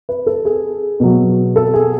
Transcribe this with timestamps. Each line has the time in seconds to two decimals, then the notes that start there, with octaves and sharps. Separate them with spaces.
0.09 B4
0.27 A4
0.45 G#4
1.00 B2 F#3
1.56 A4
1.74 G#4